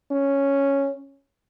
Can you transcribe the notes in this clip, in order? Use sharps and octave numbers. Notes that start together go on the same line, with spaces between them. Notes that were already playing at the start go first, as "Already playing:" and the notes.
C#4